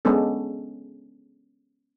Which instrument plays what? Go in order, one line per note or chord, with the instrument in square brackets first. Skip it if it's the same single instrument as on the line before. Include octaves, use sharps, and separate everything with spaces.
[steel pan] G#3 B3 C#4 D4 A4